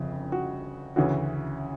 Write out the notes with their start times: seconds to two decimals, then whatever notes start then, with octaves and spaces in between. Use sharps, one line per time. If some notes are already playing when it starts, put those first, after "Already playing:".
Already playing: G1 F2 C#3
0.32 F#4
0.96 D2 C#3 E3 F#4